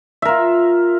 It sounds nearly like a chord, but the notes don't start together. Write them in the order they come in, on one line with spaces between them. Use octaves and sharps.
E5 A#4 F4